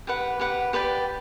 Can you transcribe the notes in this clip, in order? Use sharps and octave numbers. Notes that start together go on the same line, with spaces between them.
G4 B4 F#5
G4 B4 F#5
G4 B4 D5 G5